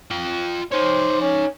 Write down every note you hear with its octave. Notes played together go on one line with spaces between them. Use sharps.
F4 G5
D#4 C5 C#5
C#4